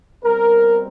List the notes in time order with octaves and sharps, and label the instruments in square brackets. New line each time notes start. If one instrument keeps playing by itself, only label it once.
[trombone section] B2 G3 C4 A#4